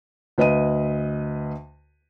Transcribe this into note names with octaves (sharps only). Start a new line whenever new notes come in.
D2 B4 D#5 D#7